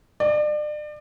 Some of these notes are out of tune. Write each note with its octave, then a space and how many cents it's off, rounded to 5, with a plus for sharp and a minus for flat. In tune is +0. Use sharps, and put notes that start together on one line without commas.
D5 +35